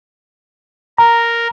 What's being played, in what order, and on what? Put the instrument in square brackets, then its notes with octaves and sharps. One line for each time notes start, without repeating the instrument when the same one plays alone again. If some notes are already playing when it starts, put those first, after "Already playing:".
[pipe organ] A#4 [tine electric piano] A#5